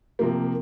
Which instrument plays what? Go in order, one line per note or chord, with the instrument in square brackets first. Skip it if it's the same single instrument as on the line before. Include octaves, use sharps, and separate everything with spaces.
[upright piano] C3 F3 A#3